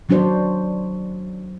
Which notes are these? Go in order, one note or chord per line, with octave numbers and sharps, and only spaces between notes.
D#3 F#3 D4 F#4 C5 D5